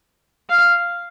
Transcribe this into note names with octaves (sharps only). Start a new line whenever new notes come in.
F5